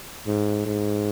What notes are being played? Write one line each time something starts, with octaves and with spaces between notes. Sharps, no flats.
G#2
G#2